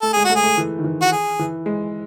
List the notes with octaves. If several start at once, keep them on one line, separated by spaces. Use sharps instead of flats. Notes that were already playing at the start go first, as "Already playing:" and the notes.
A3 A4
G#3 G#4
F#4
A3
G#4
A3
E3
D#3
E3
F#4
G#4
E3
G#3